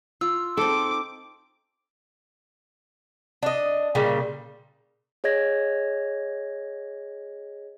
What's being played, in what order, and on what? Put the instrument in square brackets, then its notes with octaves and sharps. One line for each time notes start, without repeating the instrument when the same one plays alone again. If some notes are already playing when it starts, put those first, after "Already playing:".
[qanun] F4 [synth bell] E6
[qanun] C4 D#4 [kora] A4 [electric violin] D6
[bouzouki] D4 D#5
A#2 C#3 G3
[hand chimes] G#4 C#5 D#5 G#6 A#6